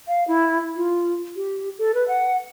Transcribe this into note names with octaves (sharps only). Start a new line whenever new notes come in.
F5
E4
F4
G4
A4
B4
F#5